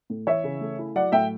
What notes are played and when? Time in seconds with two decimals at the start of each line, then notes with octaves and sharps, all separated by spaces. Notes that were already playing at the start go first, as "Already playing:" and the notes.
0.10 A2
0.27 E3 C#5 E5
0.44 C#3
0.61 A3
0.79 E4
0.96 F#3 D5 F#5
1.12 A2 E5 G5